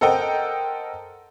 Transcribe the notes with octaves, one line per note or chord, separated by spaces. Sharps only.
A4 A#4 C5 D#5 F#5 G5